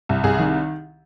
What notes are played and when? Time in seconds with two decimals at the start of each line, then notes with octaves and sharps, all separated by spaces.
0.09 C2
0.23 C2 G#4
0.39 D#3